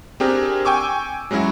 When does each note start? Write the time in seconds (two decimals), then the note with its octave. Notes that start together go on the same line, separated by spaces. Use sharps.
0.20 C4 D4 G4 G#4 A#4
0.65 G5 G#5 C#6 D6 E6
1.31 F#3 G#3 C#4 E4 F#4